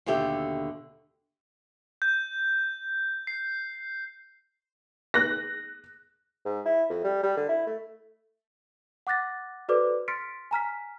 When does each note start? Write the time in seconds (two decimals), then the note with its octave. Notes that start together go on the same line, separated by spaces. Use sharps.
0.06 D#2 B2 D3 G4 E5
2.02 G6
3.27 C7
5.14 F#6 A#6
6.45 G#2
6.66 E4
6.90 F2
7.04 G3
7.23 G3
7.37 D3
7.49 E4
7.67 A3
9.07 F#5 D6 F#6 A6 A#6
9.69 F#4 A4 B4 C5 D5 D6
10.08 C6 F6 A6 B6 C#7 D7
10.51 G#5 A#5 F6 B6